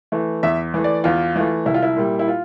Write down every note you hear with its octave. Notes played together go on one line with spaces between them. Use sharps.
E3 A3
E2 E5
E3 A3
D5
E2 F4
E3 A3
C2 E4
F4
E4
A#2 G3
E4
F4